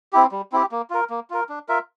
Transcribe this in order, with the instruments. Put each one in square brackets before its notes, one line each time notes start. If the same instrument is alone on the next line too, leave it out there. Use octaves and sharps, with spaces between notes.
[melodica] C4 E4 G4
G3
C4 E4 G4
A#3
F4 A#4
A#3
F4 A#4
D4
F4 A#4 E5